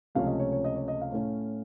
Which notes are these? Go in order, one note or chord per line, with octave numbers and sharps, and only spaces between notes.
C#2 C3 F3 A3 C#4 F5
D#5
C#5
C#5
D#5
C#5
D#5
F5
A2 A3 C#4